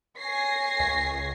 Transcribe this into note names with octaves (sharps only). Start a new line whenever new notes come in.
C#5 G#5 G#6 A#6 C7
C#2